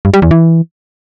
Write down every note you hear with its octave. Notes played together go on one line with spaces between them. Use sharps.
G2
G3
E2
E3